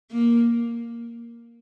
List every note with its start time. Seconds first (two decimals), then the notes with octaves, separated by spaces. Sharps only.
0.11 A#3